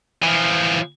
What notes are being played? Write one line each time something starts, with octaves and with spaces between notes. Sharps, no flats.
E3 F3